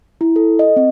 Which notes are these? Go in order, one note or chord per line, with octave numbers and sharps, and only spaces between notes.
E4
A4
D#5
C4